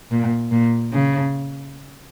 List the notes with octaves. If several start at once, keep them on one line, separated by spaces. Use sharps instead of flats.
A#2
A#2
C#3